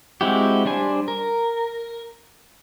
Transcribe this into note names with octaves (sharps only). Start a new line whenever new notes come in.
G#3 C4 E4 F#4 G4
G3 D4 C5 G#5
A#4